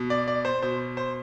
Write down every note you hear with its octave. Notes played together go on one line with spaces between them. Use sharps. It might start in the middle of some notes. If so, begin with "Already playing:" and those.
Already playing: B2
D5
D5
C5
B2 C5
C5